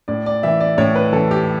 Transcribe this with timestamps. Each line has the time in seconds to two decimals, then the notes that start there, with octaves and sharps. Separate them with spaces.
0.08 A2 D5
0.26 D5
0.43 E3 E5
0.60 D5
0.78 A2 C#5
0.95 B4
1.13 E3 A4
1.31 G4